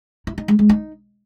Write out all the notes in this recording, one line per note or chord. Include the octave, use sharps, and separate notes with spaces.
E4
D#4
G#3
G#3
D#4